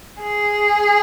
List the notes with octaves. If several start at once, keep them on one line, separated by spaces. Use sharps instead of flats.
G#4